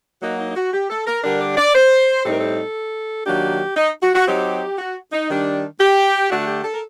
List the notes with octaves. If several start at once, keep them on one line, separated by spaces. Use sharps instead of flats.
F#3 A#3 D#4 F#4
D#4
D#4
F#4
G4
A4
A#4
D3 G3 D4 A#4
D5
D5
C5
A2 G3 C4 D#4 A4
A#4
A4
D#3 F#3 A#3 D4 G4
D#4
F#4
F#4
F#3 C4 D#4 G4
F#4
D#4
D#3 G3 D4
G4
D3 A3 D4 F#4
F#4
G4
A4
A#4